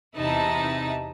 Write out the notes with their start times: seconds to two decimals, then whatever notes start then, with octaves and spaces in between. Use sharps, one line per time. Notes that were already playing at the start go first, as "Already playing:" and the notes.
0.16 E2 C3 D#4 E4 A5